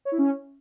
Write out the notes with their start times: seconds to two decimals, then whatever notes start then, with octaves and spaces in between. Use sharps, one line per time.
0.05 C#5
0.12 E4
0.18 C#4